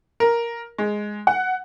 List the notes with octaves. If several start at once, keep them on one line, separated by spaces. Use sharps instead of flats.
A#4
G#3
F#5